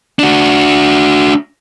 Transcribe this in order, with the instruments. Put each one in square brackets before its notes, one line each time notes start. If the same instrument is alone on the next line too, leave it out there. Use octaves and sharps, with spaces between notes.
[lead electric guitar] D4 F#4